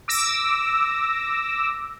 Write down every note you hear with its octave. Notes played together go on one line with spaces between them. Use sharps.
D6 E6 A#6